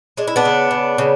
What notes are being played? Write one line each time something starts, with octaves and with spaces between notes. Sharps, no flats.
G#3 D4
E4
B3 D4
C#3
C#3
C#3